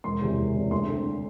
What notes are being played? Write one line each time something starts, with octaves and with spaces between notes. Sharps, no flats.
E1 C6
E2 C3
E1
E2 C3
D2 C6
D3 A3 C4